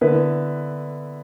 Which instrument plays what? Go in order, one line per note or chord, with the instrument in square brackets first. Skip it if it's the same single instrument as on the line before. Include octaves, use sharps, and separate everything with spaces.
[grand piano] D3 B3 E4 B4